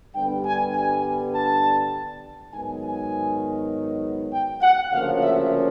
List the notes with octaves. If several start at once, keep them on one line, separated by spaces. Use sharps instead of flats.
G2 D3 G3 B3 G5
G#5
G#5
A5
G#2 D#3 F#3 B3 G#5
G#5
G5
F#5
D2 C#3 F3 A#3 C#4 F5
E5